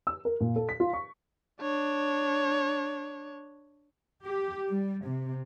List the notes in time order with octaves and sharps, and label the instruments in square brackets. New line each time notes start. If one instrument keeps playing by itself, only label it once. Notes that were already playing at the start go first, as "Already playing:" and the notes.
[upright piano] E6
A#4
A#2
A4
B6
F4
C#6
[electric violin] D4 C#5
[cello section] G4
G3
C3